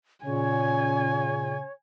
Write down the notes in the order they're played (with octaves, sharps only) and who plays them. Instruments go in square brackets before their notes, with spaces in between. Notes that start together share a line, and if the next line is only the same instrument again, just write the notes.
[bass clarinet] A#2 [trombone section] C#3 [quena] C#5 [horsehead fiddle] G#5